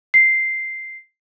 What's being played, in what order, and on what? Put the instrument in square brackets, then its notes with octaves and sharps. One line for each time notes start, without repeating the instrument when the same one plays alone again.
[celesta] C7